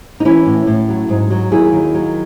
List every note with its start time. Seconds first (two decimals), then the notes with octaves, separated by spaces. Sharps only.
0.20 D#4
0.25 E3 C#4 E4
0.46 A2
0.67 A2
0.89 F#3
1.09 G#2
1.31 F#3
1.52 D#2 E4 G#4
1.73 D#3
1.94 F#3